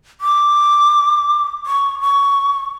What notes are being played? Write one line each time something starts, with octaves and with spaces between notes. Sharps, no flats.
D6
C#6
C#6